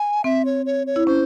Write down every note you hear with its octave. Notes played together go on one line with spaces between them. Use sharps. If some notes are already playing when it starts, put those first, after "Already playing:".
Already playing: G#5
C4 E5
C#5
C#5
C#5
E4
C#4 C5